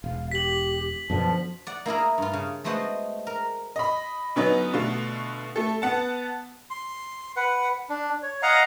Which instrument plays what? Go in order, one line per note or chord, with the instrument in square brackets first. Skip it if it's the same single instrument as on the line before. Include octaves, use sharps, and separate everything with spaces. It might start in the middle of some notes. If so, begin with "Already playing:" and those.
[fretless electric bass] E1 [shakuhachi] F5
[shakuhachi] G4 [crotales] B6 F#7
[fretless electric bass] F#2 B2 D3 [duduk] F3 [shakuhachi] A5
[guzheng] D5 F#5
A#3 E4 G#4 A#4
G2 F4
C#3
G#3 A3 B3 F#4 C5 D#5
A#4
[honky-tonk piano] D#5 B5
D3 F#3 B3 C#4 D#4 B4
B2 D3 A3 F4
A3 A4
B3 F#5 A5
[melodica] C6
B4 F#5
D4
C#5
D#5 F5 F#5 A#5